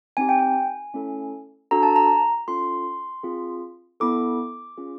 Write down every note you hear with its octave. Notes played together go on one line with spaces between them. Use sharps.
C4 D#4 G4 G#5
G5
G#5
A3 C#4 E4 A4
D4 F#4 A4 A#5
A5
A#5
C#4 F4 A4 C6
C4 F4 G#4
B3 E4 A4 D6
C#4 F4 G#4